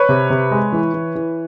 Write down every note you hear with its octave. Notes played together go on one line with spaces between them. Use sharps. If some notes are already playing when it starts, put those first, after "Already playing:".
Already playing: B4 C#5
C3
C3
G#3
E3
E3
E3